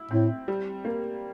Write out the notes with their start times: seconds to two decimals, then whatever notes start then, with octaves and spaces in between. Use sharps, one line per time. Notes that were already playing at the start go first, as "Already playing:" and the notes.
Already playing: E4
0.11 A2 C4
0.48 G3
0.85 A#3